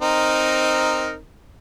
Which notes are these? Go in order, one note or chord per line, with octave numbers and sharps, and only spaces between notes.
C4 D#4 A#4